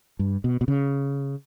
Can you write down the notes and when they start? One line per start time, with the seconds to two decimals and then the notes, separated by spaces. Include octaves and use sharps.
0.19 G2
0.44 B2
0.61 B2
0.68 C#3